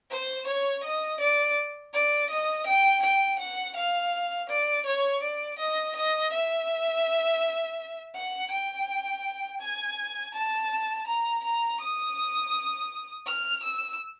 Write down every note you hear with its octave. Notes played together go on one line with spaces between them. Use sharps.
C5
C#5
D#5
D5
D5
D#5
G5
G5
F#5
F5
D5
C#5
D5
D#5
D#5
E5
F#5
G5
G#5
A5
A#5
A#5
D#6
F6
E6